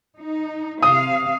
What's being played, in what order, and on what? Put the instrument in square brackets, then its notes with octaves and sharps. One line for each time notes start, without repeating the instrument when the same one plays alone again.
[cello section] D#4
[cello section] C3 F5 [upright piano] D#6